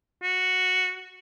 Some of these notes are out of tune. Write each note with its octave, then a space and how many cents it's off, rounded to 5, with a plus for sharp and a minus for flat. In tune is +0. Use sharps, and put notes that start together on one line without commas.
F#4 -5